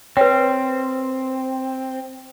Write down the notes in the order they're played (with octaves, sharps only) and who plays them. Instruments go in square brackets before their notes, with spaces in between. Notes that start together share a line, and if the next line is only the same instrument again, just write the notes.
[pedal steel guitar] C4 [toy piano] B4 G5 [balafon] C#5